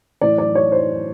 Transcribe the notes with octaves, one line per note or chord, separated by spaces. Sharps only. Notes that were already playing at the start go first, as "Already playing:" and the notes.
A2 E3 D5
D5
C#5
C5